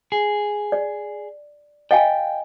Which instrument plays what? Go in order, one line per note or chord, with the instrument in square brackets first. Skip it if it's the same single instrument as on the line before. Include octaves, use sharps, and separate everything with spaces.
[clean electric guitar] G#4
[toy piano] D5
[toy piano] D#5 F5 G#5 [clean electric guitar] G5